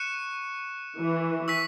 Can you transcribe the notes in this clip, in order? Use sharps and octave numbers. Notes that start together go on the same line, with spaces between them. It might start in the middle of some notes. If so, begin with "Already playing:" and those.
Already playing: C#6 F#6 C#7 E7
E3
C#6 E6 B6